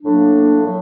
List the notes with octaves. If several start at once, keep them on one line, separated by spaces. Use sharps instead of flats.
A2 F#3 A#3 D4
A2 F#3